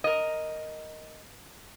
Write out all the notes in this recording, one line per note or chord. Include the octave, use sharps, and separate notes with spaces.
A#4 D#5